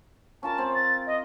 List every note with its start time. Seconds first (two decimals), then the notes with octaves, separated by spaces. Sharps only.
0.43 C#4 F4 A#4 A5
0.58 C4
0.75 A6
1.07 D#5